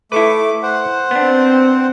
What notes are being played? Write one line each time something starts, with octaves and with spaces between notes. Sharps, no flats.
A3 E4 A4 B4 D6
C5 F#5
B3 C4 D4